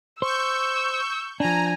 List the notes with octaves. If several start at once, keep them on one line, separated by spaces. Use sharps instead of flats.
C5 C#6 E6 G6
F3 D4 G#5 A#5